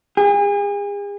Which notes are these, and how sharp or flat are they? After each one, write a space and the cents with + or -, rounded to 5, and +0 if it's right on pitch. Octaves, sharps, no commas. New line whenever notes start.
G#4 -40